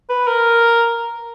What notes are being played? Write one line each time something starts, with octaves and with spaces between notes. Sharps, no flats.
B4
A#4